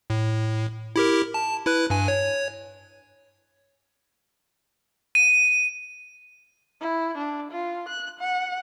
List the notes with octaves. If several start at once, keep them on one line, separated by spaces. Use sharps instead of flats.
A2
E4 G4 A#4
A5
E4 B4 F#6
G2 G#5
C#5
D#7
E4
D4
F4
F#6
F#5